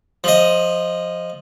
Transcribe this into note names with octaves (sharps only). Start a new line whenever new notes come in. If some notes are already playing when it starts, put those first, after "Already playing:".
F3 D#5